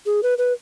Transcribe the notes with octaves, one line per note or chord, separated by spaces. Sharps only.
G#4
B4
B4